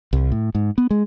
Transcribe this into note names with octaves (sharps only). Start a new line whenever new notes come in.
C2
A2
G#2
B3
G#3